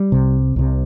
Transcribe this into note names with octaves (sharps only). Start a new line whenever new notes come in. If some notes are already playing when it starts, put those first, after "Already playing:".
Already playing: G3
C2 C3
C2 C3